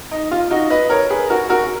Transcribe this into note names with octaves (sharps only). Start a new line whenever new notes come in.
D#4
F4
D#4 F#4
B4 D#5
A#4 C#5
G#4 B4
F#4 A#4
F#4 A#4